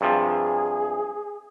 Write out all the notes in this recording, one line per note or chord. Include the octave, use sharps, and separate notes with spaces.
G2 C3 F3 G#4